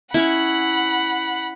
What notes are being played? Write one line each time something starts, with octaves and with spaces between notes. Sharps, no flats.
C#4 E4 F#5 B5